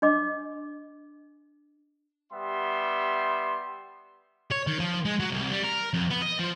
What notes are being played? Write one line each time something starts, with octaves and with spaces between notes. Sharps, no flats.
D4 D#5 D6
G3 B3 G4 E5 C6
C#5
D#3
F3
G#3
F#3
C2
G3
A#4
F2
B3
D#5
F3